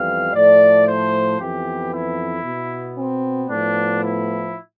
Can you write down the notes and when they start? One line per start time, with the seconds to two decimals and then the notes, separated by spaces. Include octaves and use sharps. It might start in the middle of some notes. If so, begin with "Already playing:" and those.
Already playing: F2 E3 G3 B3 F5
0.34 A2 F3 A3 D5
0.87 C5
1.39 F2 E3 B3 G4
1.92 E4
2.45 B2 B3
2.98 C4
3.50 A2 F3 B3 D4
4.03 E4